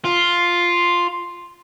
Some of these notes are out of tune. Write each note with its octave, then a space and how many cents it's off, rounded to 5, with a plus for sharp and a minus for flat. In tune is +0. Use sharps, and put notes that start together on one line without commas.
F4 +0